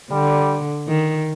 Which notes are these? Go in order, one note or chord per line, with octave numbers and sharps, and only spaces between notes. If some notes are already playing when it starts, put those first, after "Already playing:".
D3 G3
D#3